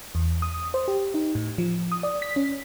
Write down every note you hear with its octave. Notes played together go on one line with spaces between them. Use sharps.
E2
D#6
C5
G4
D#4
A2
F3
D#6
D5
B6
C#4